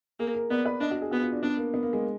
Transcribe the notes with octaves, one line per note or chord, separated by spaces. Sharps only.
A#3 G#4
A#4
B3 D5
B4
D4 D#5
F#4
G#4
B3 F#4
F4
D4
B3 D4
A#3
B3
A#3
G#3